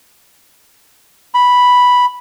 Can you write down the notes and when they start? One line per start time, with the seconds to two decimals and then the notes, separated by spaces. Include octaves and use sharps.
1.34 B5